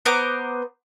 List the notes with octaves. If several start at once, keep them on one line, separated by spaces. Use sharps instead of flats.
B3 C5 A#5 D6